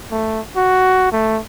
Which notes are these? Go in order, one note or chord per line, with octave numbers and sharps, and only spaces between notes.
A3
F#4
A3